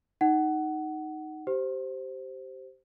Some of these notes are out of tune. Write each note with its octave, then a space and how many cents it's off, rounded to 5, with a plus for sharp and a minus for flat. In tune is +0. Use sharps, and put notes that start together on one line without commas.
D#4 +0 F#5 +20
G4 -20 C5 +0